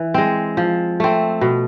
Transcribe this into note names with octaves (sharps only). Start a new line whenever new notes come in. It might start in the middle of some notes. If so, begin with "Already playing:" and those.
Already playing: E3
G#3 C4
F3
A3 C4
B2